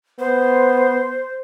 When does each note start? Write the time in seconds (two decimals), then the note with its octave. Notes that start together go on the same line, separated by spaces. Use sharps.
0.19 B3 C5